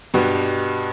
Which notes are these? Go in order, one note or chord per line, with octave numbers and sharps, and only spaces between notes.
G2 B2 B3 F#4 G4